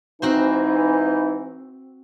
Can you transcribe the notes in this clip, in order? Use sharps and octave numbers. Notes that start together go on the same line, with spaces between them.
G#2 E3 C4 D#4 F#4 C5